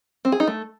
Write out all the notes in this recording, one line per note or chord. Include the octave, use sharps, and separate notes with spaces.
C4
G#4
D#4
A3